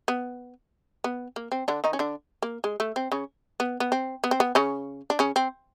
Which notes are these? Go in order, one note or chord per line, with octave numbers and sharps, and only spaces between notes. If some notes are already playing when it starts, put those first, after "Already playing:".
B3
B3
A#3
C4
D3 D4
D#3 D#4
C#4
D3 D4
A#3
G#3
A3
C4
C#3 C#4
B3
B3
C4
B3
C4
B3
C#3 C#4
D4
C#3 C#4
C4